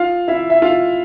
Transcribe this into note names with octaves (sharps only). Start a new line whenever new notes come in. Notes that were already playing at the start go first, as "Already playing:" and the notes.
Already playing: F4 F5
E4 E5
E5
F4 F5